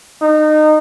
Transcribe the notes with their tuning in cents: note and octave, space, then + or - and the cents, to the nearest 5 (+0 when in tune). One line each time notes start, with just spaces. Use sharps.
D#4 -25